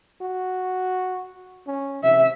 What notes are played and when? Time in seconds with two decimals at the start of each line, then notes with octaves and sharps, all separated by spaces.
0.21 F#4
1.67 C#4
2.04 C3 E5